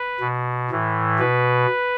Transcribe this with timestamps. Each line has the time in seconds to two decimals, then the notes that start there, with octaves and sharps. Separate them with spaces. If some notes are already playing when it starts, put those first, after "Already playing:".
Already playing: B4
0.20 B2
0.70 A2 E3
1.20 B2 B4